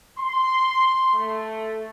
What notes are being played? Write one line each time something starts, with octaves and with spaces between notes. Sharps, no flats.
C6
A3